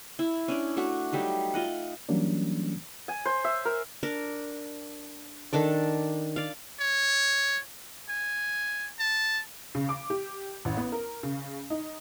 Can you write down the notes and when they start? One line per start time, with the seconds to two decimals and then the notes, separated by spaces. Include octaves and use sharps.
0.19 E4
0.48 C#4 D4 D5
0.77 A3 D4 F#4
1.13 F#3 G3 A3 D#4
1.54 F4 D#5 F#5
2.09 E3 F#3 G3 A#3 C#4 D4
3.08 G#5
3.26 C5
3.45 E5
3.65 A#4
4.03 D4 A#4
5.53 D#3 D4 A4 D5
6.36 D5 F5
6.80 C#5
8.09 G#5
8.99 A5
9.75 C#3
9.89 D6
10.10 G4
10.65 A1
10.77 B3
10.92 A#4
11.23 C#3
11.70 D#4